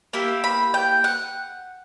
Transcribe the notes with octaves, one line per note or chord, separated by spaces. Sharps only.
A#3 E4 G4
B5
G5
F#5